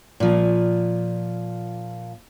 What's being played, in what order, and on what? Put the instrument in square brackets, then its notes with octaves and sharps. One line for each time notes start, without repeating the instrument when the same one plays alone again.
[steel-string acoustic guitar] A#2 F3